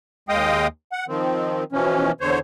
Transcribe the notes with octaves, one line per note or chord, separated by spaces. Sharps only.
D#2 G#3 D#5 F5 G5 D#6
F#5
D#3 F3 C4
B2 E3 F3 C#4
E2 D3 C5 C#5